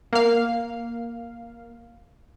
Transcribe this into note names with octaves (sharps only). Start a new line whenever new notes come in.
A#3 F5